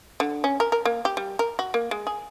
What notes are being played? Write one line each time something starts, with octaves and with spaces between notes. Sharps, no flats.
D3
C#4
A#4
A#4
A#3
G4
G3
A#4
F#4
A#3
G#3
G#4